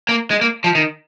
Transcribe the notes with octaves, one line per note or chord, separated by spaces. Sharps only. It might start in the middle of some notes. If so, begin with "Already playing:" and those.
A#3
G#3
A#3
F3
D#3